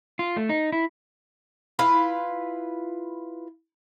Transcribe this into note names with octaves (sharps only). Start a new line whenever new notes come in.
F4
A3
D#4
E4
E4 F4 B4 F5